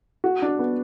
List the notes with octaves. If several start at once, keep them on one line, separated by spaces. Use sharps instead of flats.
F#4
D4
B3